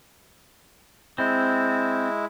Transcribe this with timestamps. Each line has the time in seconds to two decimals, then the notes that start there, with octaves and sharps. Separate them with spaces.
1.18 G#3 C4 E4